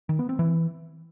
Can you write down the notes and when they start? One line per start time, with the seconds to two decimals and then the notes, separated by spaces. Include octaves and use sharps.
0.09 D#3
0.19 B3
0.29 C4
0.39 E3